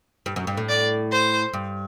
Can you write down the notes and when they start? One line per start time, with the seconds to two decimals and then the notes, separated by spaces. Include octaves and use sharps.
0.26 G2
0.36 F#2
0.47 G2
0.57 A2
0.69 D5
1.11 C5
1.53 G2